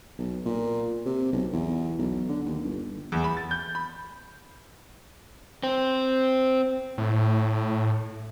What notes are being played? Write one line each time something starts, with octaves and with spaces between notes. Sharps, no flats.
B1
A#2
C3
B1
E2
B1
D3
D#2
G1
E2
B5
A6
G6
B5
C4
A2